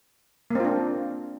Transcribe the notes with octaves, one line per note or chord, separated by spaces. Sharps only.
A#3 C4 D4 F4